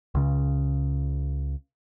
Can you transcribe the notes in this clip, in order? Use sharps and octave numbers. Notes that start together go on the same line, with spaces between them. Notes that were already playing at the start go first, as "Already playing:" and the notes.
C#2 C#3